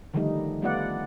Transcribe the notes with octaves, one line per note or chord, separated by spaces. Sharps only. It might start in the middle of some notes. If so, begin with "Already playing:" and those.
D3 D#3 F3 G3 A3 D#4
G3 A3 B3 F4 D5 F#5